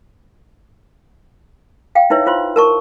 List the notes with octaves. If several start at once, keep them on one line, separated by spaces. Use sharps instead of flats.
F5 G5
D#4 E4 B4 C#5 E5
E4 F4 C5 C6
A#4 A5 C#6